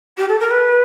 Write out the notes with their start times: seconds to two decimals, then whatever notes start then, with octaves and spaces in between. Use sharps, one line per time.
0.17 G4
0.28 A4
0.39 A#4
0.50 B4